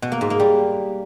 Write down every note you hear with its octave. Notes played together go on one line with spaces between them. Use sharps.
B2
A#3
G#2
A#3
G3